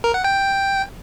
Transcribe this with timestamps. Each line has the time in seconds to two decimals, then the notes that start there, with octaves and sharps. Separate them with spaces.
0.04 A#4
0.14 F#5
0.24 G5